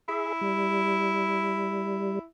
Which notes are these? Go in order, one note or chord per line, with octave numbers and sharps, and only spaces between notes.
E4 G#4 E5
G3